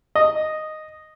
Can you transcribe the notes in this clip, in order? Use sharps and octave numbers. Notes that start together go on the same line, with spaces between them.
D#5